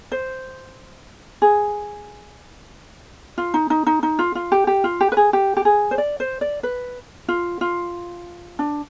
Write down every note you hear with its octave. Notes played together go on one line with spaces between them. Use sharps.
C5
G#4
F4
D#4
D#4
D#4
D#4
F4
F4
G4
G4
F4
G4
B4
G#4
G4
G4
G#4
C5
D5
C5
D5
B4
F4
F4
D4